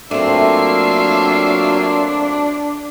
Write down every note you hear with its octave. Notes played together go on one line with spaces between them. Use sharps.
F#3 A3 A#3 C4 D4 F4 E5 C7